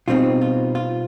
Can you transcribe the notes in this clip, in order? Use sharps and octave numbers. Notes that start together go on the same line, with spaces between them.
B2 G3 C4 D#4 F4
F4
F4